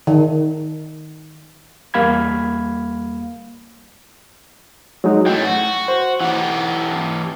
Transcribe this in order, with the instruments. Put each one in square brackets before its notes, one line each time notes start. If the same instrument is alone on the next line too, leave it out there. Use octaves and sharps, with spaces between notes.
[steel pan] D#3
[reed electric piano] E2 G3 A#3 F5 B5 G#6
F#3 G#3 D#4
[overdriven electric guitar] E3 A3 [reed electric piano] G5
[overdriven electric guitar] F#4
[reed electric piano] C5
[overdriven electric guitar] E3 G4 [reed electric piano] F#5